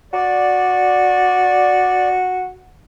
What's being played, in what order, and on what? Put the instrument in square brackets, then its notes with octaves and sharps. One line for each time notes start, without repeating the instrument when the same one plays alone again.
[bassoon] F#4 [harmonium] D5